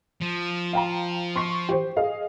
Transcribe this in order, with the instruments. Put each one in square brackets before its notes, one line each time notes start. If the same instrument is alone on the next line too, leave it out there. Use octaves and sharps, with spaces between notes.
[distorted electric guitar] F3
[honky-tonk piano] F5 G5 A#5
C6 C#6 C7
G4 C5
G#4 D#5 F5